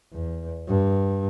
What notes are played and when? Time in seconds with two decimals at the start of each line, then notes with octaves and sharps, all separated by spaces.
0.13 E2
0.68 G2